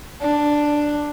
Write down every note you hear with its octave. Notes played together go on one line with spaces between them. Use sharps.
D4